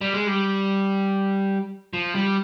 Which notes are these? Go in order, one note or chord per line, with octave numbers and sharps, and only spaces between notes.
G3
G#3
G3
F3
G3